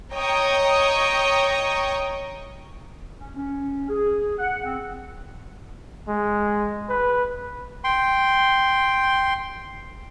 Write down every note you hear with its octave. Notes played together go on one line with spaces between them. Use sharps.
C#5 D#5 G5 A#5 C#6 D#6
C#4
C#4
G#4
F#5
C4
G#3
B4
G5 C6